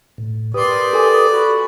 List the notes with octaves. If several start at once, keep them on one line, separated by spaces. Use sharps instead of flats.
A2
G4 A#4 B4 D5 C6 D#6
A4 G#5 D6
F#4 B5